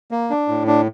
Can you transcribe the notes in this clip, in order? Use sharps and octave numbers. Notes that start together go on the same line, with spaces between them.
A#3
D4
A2
D4